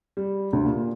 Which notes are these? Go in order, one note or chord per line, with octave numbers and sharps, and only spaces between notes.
G3
D2
A#2